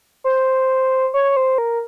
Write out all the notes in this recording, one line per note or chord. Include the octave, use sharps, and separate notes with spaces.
C5
C#5
C5
A#4